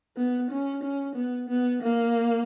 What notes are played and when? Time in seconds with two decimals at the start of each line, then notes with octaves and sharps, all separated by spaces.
0.17 B3
0.51 C#4
0.83 C#4
1.16 B3
1.49 B3
1.82 A#3